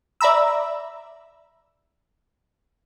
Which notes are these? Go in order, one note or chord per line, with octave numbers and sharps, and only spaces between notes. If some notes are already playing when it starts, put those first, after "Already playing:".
D5 E5 A#5 B5 E6